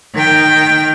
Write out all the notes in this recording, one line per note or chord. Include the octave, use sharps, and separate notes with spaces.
D#3 G5